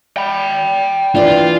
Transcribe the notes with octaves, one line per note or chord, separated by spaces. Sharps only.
G5 B5
E3 D4 F4 D5